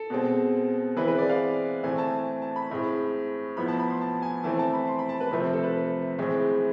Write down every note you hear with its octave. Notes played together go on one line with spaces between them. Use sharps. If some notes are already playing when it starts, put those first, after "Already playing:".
Already playing: A4
B2 G#3 C4
E3 G#3 C4 B4
B4
D5
F5
A2 E3 A3 C4 G#5
A5
A5
B5
A2 G#3 C4
A2 F3 B3 B5
A5
B5
C6
A5
G#5
E3 A3 C4 A5
A5
B5
C6
B5
A5
B4
C3 F3 A3 C4
A4
B4
A2 E3 G#3 C4